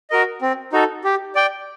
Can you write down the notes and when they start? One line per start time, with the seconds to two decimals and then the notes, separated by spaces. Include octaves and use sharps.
0.10 F#4 A#4 D#5
0.42 C4
0.73 D#4 F#4 A4
1.04 G4
1.35 D5 G5